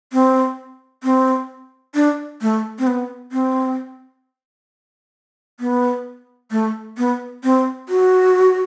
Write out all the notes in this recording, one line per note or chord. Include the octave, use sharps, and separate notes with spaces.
C4
C4
D4
A3
C4
B3
C4
B3
A3
B3
C4
F#4